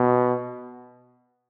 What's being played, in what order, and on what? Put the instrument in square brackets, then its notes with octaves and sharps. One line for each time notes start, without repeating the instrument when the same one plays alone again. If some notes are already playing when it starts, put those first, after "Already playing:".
Already playing: [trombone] B2